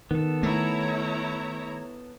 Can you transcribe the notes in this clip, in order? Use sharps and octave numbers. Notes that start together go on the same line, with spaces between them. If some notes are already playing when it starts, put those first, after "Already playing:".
D#3 B3 A4
A3 E4 C#5 A#5